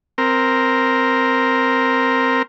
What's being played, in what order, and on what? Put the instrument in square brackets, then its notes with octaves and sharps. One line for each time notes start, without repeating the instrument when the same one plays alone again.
[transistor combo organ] C4 A#4